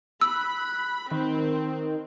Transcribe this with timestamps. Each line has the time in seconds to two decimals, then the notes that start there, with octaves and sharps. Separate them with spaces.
0.21 B5 E6 F#6
1.11 D#3 C4